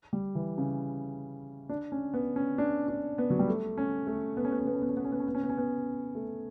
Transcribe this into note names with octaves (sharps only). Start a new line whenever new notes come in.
G3
E3
C#3
D4
C#4
B3
C#4
D4
D4
B3
F#3
G3
A3
C#4
A3
B3
C#4
B3
C#4
B3
C#4
B3
C#4
B3
C#4
B3
C#4
B3
C#4
B3
C#4
B3
A3